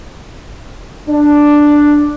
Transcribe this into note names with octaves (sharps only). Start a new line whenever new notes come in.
D4